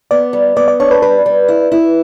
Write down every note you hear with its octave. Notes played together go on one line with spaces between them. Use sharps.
B3 D5
G3
B3 D5
D5
D4 C#5
B4
G3 B4
G3
E4
E4